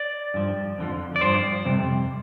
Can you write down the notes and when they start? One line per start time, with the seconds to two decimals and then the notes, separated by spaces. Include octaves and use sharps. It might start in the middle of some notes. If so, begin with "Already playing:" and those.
Already playing: D5
0.34 G2 F3
0.78 F2 D3 F3
1.16 D5
1.21 G2 F3 C5
1.65 F2 C3 G3